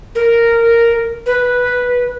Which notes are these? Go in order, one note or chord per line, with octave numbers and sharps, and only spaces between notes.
A#4
B4